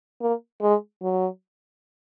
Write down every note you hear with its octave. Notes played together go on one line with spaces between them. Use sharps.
A#3
G#3
F#3